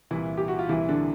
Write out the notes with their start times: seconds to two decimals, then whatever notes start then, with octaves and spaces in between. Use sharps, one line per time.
0.11 C2 A#2 E3 E4
0.37 G4
0.48 F#4
0.59 F4
0.69 C2 A#2 E3 E4
0.89 D3 D4